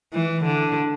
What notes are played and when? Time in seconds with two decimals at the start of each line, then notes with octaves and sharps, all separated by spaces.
0.13 E3
0.44 D3